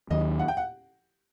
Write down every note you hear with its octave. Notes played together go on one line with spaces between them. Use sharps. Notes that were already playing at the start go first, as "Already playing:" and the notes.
D#2 D#3 F#3 D#5
F#5
G5
F#5